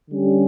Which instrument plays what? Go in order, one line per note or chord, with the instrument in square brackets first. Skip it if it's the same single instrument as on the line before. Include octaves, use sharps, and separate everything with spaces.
[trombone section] D3 G3 C#4 G4